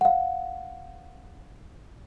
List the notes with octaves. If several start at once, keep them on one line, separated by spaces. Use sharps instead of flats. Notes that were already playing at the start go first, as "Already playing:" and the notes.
F5 F#5